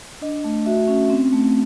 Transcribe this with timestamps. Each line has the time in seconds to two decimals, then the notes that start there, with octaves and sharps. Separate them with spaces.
0.21 D4 D#5
0.44 A3
0.66 F#4 E5
0.88 C#4
1.10 C4
1.33 A3